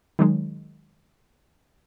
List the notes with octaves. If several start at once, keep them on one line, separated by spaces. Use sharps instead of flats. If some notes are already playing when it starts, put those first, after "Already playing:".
D#3 F#3 G#3